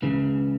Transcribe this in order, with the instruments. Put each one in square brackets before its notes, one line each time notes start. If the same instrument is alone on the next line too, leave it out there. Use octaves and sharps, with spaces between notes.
[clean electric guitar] C#2 C#3 E3